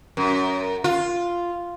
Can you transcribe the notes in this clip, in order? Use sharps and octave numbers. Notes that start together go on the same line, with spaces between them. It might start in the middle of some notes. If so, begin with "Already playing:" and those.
F#2
F4